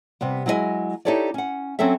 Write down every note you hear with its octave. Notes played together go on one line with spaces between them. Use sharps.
C3 G3 B3
F#3 G#3 E4 B4 D#5 G#5
D#4 E4 G4 A4 C#5 D5
C#4 F#5
F#3 C4 C#4 A4 E5